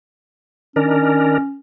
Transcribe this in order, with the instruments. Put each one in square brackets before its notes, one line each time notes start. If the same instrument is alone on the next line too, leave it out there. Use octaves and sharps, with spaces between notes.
[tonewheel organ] D#3 D4 A#4 [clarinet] C#4